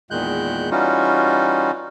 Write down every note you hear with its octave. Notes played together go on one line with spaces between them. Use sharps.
E2 A#2 D#3 G#3 F#6 G6
E3 G3 C#4 D#4 F4 F#4